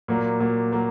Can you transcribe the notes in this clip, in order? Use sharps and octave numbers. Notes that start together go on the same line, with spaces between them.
A#2 F#3 A#3
A#2 F#3 A#3
F#3 A#3